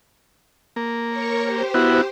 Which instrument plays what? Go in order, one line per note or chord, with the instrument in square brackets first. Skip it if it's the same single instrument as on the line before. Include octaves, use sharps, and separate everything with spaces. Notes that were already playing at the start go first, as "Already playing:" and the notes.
[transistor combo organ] A#3
[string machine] A#4 C#5 C#6
G4 C5
[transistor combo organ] B3 E4 F#4